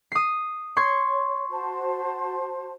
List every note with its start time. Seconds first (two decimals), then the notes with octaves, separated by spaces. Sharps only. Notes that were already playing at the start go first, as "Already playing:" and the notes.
0.12 D#6 C7
0.77 C#5 C6 C#6 G#6
1.50 F#4 C5 A5